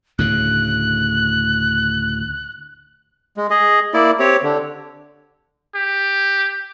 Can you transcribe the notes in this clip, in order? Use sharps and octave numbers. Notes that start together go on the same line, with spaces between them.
D2 A2 C#3 F#6
G#3
G#4 D#5
A#3 E4 D5
C4 G4 C#5
D3
G4